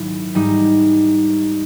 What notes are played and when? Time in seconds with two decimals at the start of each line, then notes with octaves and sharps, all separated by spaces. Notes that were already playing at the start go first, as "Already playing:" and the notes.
Already playing: G#2 D#3 F#3 E4
0.35 G#2 E3 G3 D#4